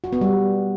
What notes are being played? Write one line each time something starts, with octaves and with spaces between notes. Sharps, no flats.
F#4
B3
G3